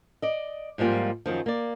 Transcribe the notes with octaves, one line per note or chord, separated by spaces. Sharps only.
D5 D#5
G#2 F3 G3 A#3 F4
F#2 D#3 F3
A#3 D5